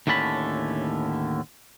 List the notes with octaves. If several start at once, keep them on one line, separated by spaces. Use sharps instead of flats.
D#2 A2 D3 C#4 A5 B5